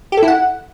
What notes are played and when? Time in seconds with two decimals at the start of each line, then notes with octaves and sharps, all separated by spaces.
0.12 G4
0.17 A4
0.23 E4
0.28 F#5